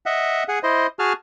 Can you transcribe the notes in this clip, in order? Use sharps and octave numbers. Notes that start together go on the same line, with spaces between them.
D#5 E5 F#5
G#4 F#5
E4 C5 D#5
F#4 G#4 A5 F6